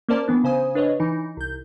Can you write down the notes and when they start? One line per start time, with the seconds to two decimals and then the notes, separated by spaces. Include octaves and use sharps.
0.09 A#3 C#4 A#4 C5 D5 A5
0.28 E3 B3 D4
0.44 C#3 C5 G#5 D#6
0.75 D4 B4 C#5 D#5
1.00 E3 D#4
1.37 C2 G6